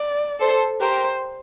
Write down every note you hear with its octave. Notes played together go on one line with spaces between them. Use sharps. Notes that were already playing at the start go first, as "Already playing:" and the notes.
Already playing: D5
A4 C5
G4 A#4 C5